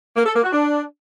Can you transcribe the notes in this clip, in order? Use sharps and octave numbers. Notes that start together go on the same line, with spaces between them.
A#3
A4
A#3
F#4
D4